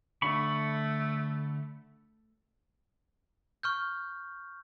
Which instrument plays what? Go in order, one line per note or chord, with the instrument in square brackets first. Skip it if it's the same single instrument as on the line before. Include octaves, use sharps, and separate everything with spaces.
[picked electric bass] D3 D4 [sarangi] A3 [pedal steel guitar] B5 C#6
[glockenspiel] C#6 F6 G6